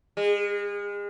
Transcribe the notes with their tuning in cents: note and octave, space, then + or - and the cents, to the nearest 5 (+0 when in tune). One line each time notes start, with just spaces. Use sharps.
G#3 -35